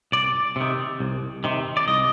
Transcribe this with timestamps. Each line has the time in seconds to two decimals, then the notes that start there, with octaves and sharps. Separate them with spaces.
0.12 C2 D5
0.56 C3 D#3
1.00 C2
1.44 C3 D#3
1.77 D5
1.87 C2 D#5